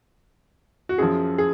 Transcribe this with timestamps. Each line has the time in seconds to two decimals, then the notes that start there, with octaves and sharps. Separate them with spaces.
0.89 F#4
0.98 F#2 F3 G#4
1.38 G#4